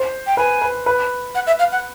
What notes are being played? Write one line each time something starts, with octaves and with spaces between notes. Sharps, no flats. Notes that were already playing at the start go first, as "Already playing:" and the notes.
Already playing: C5
G5
B4 G#5
B4
B4
F#5
E5
F5
F#5